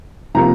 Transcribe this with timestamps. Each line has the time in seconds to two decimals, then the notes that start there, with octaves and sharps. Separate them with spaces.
0.35 C3 F3 A#3 A#5